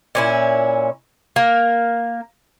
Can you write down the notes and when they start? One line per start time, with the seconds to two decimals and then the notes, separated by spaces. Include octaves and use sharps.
0.15 A#2 C#4 E4
1.36 A#3 A#4